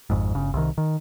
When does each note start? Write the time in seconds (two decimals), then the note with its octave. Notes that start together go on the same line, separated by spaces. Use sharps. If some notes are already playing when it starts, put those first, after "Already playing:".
0.10 G#1 F2 G#2
0.35 G1 C#3
0.54 C2 D#3
0.78 D#3